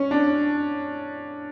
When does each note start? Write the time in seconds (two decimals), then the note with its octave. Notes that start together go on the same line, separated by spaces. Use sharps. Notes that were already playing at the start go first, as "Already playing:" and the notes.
Already playing: C#4
0.11 D4